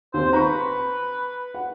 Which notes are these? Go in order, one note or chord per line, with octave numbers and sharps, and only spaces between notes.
D#2 C4 C5
B4 A#5 B5 C#6
F#5